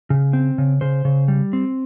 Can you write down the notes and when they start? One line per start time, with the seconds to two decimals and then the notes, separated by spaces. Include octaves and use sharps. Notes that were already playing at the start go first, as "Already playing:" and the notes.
0.10 C#3
0.33 C4
0.58 C#3
0.81 C#3 C5
1.05 C#3
1.28 G3
1.53 C4